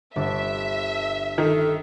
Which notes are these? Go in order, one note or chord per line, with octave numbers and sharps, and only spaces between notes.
G1 D4 E5
D#3 A4